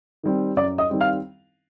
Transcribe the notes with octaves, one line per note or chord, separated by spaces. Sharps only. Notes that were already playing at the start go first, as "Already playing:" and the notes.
D#3 G3 C4
F#2 D5 D6
D#5 D#6
D#3 G3 C4
F5 F6